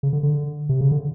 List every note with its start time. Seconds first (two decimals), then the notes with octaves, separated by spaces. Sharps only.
0.03 C#3
0.13 D3
0.23 D3
0.69 C3
0.81 C#3
0.91 D3